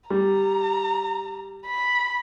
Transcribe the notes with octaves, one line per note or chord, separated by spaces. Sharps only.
G3 A#5
B5